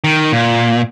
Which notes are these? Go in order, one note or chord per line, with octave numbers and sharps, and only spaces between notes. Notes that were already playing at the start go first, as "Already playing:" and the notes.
D#3
A#2